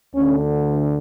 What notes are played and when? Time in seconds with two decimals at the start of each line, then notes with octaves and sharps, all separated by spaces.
0.15 D2 D3 C#4